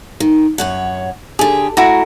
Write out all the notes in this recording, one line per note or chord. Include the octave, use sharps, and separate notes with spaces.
D#3
F#2 C#5 F#5
D3 G4 G#4
A3 E4 F#4 A#5